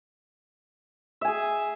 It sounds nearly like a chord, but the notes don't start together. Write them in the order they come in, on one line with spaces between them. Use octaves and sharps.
E5 G#5 G#4